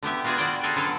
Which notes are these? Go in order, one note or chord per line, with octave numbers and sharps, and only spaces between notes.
D3 B3 G4 E5
B3 F4 F#4 G#4 D5
F#4 D5 F#5 G5
F4 F#4 G#4 A4
D3 F#3 A4 B4